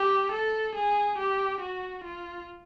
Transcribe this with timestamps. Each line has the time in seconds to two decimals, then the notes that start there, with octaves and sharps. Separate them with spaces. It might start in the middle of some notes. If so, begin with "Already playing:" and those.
Already playing: G4
0.32 A4
0.75 G#4
1.19 G4
1.61 F#4
2.04 F4